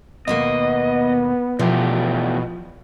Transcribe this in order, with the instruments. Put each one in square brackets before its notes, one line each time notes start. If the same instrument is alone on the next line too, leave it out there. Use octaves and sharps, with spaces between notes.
[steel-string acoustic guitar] D#2 B2 A#3 [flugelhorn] B3 [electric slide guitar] D#5
[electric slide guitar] E2 A3 G4 [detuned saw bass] B2 [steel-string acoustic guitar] F3